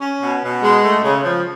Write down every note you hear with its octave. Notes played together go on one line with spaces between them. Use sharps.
C#4
B2
B2
G#3
A3
C#3
F3